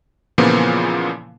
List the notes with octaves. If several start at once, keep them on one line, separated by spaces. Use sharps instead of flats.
A#2 C#3 E3 F3 A#3 B3